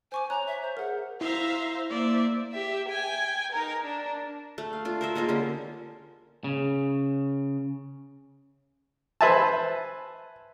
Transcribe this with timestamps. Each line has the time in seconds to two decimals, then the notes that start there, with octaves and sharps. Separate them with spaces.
0.12 C5 G#5 C#6 D6
0.30 C#5 A#5 F#6
0.47 E5
0.62 C5
0.77 G#4 A#4 F#5
1.21 E4 C5 E5 F5 A#5
1.90 A#3 C5 D5 E5
2.52 G4 E5
2.89 G5 G#5
3.52 D#4 A#4
3.84 D4
4.58 A3
4.73 F5
4.85 D4 F4
5.01 A#4 C5 E5
5.15 G#3 A#3 D#4 F4
5.29 D3 G3 C#4
6.44 C#3
9.21 B4 C5 E5 G#5 A5